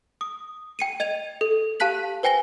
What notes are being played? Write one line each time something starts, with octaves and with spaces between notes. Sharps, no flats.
D#6
G5 C#7 D#7
D#5 G#6 D#7 F7
A4
G4 F5 A5 F#6 B6 F#7
B4 C5 G5 G#5 A#6 G7